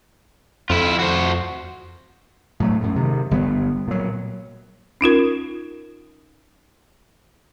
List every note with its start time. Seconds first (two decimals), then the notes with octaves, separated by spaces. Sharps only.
0.70 F2 E4 F4
0.99 F#4 C5
2.60 A2 F#3 A3
2.80 F#2 A2
2.96 C3 D#3
3.31 G1 G3 B3
3.88 A#2 F#3
5.01 C#4 D#4 F4 A#4